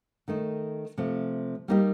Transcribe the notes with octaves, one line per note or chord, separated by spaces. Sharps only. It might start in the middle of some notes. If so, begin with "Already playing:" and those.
D#3 A3 D#4
C3 F3 A3
G3 A#3 D#4 G4